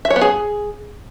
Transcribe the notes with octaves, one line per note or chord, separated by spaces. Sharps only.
E5
C#5
B3
G#4